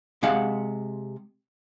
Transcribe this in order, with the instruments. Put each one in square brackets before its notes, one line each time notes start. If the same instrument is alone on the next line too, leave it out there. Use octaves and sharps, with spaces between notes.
[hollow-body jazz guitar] C3 G#3 F5 F#5